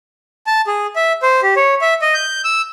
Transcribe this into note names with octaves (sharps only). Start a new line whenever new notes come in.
A5
G#4
E5
C5
G4
C#5
E5
D#5
G6
E6